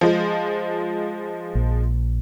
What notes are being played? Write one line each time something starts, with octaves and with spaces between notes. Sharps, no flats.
F3 G#3
A#1